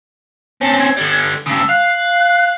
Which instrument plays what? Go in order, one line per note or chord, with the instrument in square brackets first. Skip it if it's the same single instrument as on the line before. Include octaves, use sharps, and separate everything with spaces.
[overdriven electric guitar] C4 C#4 [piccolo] A5
[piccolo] G#6
[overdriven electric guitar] D3 G3
[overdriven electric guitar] G2 C#3 [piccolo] E6
[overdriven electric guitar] F5 [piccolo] F#6